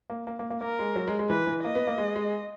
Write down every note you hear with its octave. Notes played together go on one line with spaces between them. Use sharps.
A#3
A#3
A#3
A#3
A#3 A#4
G#3
F#3
G#3
G#3
E3 B4
E3
A#3 D#5
B3
A#3
G#3
G#3